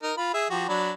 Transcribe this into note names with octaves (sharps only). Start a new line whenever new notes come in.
D#4 A#4
F4 B5
G#4 E5
F3 F#4 G4
F#3 D4 B5